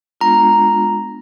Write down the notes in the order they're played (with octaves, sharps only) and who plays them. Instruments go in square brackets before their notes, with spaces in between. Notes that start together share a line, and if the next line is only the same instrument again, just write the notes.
[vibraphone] G#3 B3 D4 F4 [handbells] A#5